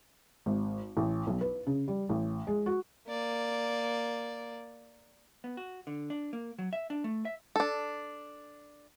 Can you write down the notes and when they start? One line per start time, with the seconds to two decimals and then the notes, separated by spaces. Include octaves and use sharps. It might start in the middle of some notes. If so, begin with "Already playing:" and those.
0.46 G#1
0.97 A1
1.27 B1
1.41 B4
1.67 C#3
1.88 G3
2.09 A1
2.47 G#3
2.66 F#4
3.08 A#3 D5
5.44 B3
5.57 F#4
5.87 D3
6.10 D4
6.33 A#3
6.59 F#3
6.73 E5
6.90 D4
7.04 A3
7.25 E5
7.56 D4 A4